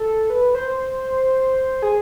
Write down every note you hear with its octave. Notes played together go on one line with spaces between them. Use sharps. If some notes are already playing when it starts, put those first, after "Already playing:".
Already playing: A4
B4
C5
G#4